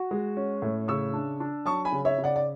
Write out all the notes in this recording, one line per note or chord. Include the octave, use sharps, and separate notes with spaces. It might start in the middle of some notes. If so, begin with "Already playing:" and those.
Already playing: F#4
G#3
C#4
A2
C#3 C#6 E6
D4
D4
F#3 A5 C#6
G#5 B5
C#3
C#5 E5
C#3
D5 F#5
D5